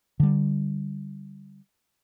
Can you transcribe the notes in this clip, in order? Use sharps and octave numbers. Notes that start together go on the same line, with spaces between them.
D3 G3